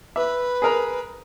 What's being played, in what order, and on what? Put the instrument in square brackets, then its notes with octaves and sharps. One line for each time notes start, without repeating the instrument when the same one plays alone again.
[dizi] B4 [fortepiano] E5
[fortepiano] G#4 A#4 A#5